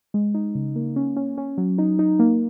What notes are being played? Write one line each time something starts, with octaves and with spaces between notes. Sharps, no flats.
G#3
D#4
C#3
A#3
C#4
C#4
C#4
F#3
D#4
D#4
A#3